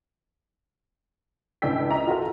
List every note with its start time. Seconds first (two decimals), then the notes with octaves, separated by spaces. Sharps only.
1.62 C#2 A2 D4 G5 E6 B6
1.91 D#5 A#5
2.07 F4 F#4 A4 A#4